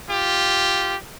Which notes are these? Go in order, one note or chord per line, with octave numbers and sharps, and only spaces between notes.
F4 G4